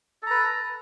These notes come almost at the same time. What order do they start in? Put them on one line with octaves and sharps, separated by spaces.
A4 A#5 B4